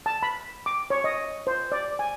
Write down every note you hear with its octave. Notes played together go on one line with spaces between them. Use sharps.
A5
B5
D6
C#5
D#5
C5
D5
G#5